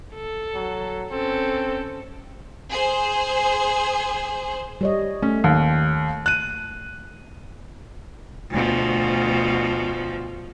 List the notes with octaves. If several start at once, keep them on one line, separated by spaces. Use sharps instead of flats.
A4
F#3
C4 C#4 A4
G#4 C5
G3 C#5 D#5
A3 C#4
D#2
F#6 D#7
D2 B2 F3